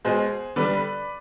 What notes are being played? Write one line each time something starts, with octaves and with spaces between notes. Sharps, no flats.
B2 G#3 G#4 C5
D3 G3 B4 D5